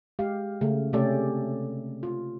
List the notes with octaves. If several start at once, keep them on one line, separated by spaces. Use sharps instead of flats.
G#3 G4 F5
C#3 A3
C3 A3 C#4 G4 A4 D5
F4